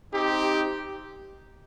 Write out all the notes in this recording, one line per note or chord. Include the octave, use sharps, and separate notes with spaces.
C4 D#4 G4